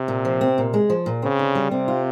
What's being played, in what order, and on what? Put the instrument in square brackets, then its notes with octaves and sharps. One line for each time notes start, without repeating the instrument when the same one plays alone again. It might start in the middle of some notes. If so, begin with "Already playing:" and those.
Already playing: [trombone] C3
[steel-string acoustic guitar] A#2
F3
C4
A#2
G#3
F3
A#2
[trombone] C#3 [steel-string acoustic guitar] C4
[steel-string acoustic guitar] D3
G3
[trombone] C3 [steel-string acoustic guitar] C4
[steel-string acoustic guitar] F4